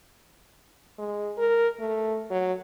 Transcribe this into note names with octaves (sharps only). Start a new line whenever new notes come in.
G#3
A#4
A3
F#3